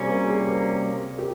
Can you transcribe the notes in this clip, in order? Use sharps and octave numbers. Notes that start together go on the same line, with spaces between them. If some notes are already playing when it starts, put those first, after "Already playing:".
Already playing: C3 G3 A#3 C#4 G#4 C5
A#4
G#4
G4
A#4
G4